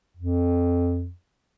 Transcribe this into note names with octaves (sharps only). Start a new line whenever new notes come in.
F2